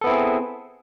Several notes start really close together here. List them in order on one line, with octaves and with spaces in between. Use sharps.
A4 B3 E4 C4 G#4